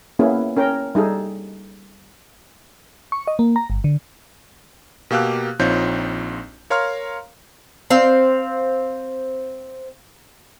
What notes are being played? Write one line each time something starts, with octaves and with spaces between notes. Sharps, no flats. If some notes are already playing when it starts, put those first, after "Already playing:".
A#3 B3 C#4 E4 G#4
C#4 A#4 G5
G3 D#4 G#4 A4
C#6
D#5
A#3
A#5
G1
D3
B2 A#3 G4 F5 E6 F#6
A#1 C4 D#4 F4 C#5 G6
A#4 C#5 F5 A#5 C6 F6
C4 F5